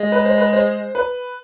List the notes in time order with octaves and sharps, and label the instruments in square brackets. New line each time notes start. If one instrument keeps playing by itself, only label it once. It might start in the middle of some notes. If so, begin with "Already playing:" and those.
Already playing: [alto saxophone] G#3
[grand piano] B4
C5
B4
C5
B4